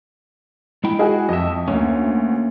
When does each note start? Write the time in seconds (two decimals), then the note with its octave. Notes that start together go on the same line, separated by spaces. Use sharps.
0.84 G#3 E4 G5
0.99 F#4 G#4 D#5
1.29 F2 D#5 E5
1.68 D2 A#3 C#4